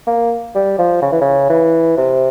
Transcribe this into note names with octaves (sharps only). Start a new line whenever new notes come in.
A#3
G3
F3
C#3
E3
C#3
E3
C3